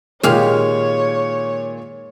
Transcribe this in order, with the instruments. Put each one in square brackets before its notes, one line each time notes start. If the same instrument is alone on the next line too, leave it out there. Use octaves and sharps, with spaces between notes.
[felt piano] A#2 D#3 A#3 [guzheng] G#3 G4 F5 [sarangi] C#5